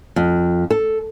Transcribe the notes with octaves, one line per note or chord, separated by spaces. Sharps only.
F2
A4